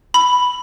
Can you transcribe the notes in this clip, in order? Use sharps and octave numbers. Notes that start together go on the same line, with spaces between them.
B5